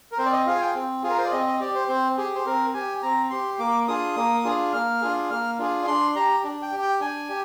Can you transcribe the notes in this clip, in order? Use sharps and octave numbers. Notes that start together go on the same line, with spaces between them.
A#4
C4 C5
D5
D#5
F4 G#4 F5
G#5
G5
C4
F4 G#4
A#4
C5
D5
C4 D#5
D#5
G4 D5
C5
C4 C5
G4 G#4
C5
C4 A#4
G4 G#5
C4 A#5
G4 C6
A#3 D6
D4 F4 G#4 D#6
A#3
D4 F4 G#4
A#3 F6
D4 F4 G#4
A#3 F6
D4 F4 G#4
D4 C6
G4 A#5
D4
G5
G4
G5
D4 G#5
G4